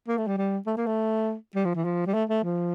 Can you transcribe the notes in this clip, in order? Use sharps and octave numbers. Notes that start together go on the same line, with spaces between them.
A#3
A3
G3
G3
A3
A#3
A3
G3
F3
E3
F3
G3
A3
A3
F3